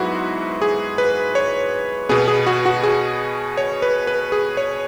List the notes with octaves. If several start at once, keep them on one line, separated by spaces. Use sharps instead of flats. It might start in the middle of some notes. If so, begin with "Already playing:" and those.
Already playing: G#2 F#3 B3 E4 F#4
G#4
B4
C#5
B2 B3 G#4
G#4
F#4
F#4
G#4
C#5
B4
B4
G#4
C#5